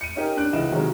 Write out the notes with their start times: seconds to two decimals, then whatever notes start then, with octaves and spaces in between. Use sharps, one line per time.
0.01 C#7 D#7
0.16 C#4 D#4 G4 A#4
0.37 D4 F#6 D7
0.53 C#2 E3 D#5 F#5 E7
0.71 C3 D#3 F#3 G#3 C#4